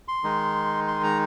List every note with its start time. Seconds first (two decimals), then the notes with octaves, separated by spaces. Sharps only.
0.08 C6
0.23 D#3 G#3 D#4
0.88 C6
1.04 A#5